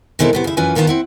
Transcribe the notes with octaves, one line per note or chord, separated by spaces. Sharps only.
B2 G#3 C4 E4 A4 A#4
A2 C3 B3
C#3 E4
F#2 E3 C#4 F4 B4 G#5
G#2 D#3 B3 F4 A5 A#5
C4 E4 F#5